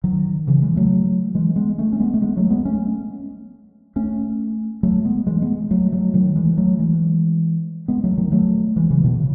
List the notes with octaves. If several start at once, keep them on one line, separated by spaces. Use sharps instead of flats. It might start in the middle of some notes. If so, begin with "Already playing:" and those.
D#3 F#3
C#3 E3
E3 G#3
F#3 A3
E3 G#3
G#3 B3
A3 C#4
C#4
G#3 B3
A3
G#3 B3
F#3 A3
G#3 B3
A3 C#4
A3 C#4
F#3 A3
G#3 B3
E3 G#3
G#3 B3
F#3 A3
F#3 A3
D#3 F#3
E3 G#3
F#3 A3
E3 G#3
G#3 B3
F#3 A3
D#3 F#3
F#3 A3
E3 G#3
C#3 E3
B2 D#3
C#3